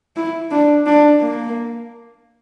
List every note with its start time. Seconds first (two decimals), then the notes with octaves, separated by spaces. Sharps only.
0.16 E4
0.51 D4
0.86 D4
1.21 A#3